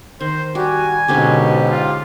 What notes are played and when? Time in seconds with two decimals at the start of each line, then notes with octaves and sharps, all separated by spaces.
0.21 D#3 C5
0.55 G3 F#4 G4 G#5
1.08 G#2 B2 D3 C#4 G4 C5
1.69 F4